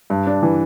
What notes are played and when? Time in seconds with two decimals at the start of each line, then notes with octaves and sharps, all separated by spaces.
0.10 G2
0.27 D4
0.43 E3